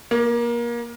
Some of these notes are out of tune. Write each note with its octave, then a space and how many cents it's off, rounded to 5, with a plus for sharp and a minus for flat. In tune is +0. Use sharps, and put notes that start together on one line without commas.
A#3 +25